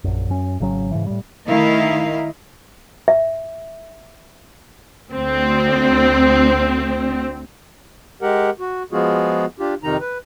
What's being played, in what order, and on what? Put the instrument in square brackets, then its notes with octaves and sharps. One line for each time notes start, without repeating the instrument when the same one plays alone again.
[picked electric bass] A#1 F#2
F#2 C#4
G#1 C#3 F#3 C#4
G#2 C#3 E3
A2 G3
[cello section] D#3 A3 E4 A#4 D#5 F5
[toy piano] E5
[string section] D2 C4
[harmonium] G#3 G4 A#4 F#5
F#4
F3 G#3 B3 F4 F#4 G#4
D4 F4 G4
F2 C3 D#3 D#4 A#5
B4